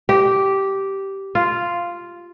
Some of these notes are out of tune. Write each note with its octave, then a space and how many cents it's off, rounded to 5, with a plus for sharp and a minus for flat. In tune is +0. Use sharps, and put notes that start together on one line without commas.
G4 -10
F4 -5